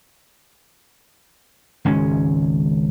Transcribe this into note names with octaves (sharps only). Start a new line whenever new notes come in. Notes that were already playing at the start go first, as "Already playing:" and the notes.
G#1 C#2 G#3 C#4